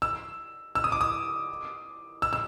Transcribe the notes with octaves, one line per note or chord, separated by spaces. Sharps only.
E6
E6
D#6
D6
D#6
E6
E6